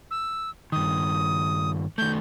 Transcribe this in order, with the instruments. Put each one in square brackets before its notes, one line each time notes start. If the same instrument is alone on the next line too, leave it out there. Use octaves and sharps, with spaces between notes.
[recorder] E6
[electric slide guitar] G2 D#3 [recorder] D#6
[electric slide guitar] D#3 A3 [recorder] G6